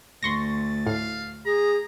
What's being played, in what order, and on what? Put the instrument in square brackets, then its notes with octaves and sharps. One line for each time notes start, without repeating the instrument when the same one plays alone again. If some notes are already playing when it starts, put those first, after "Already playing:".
[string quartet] D2 A6 [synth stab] C6 C#6 A#6
[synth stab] A2 [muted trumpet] F5
[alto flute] G#4 [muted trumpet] A#5